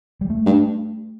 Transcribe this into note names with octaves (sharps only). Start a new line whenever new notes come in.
G3
A3
G2